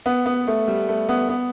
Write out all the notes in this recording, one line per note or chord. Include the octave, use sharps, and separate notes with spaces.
B3
B3
A3
G3
A3
B3
B3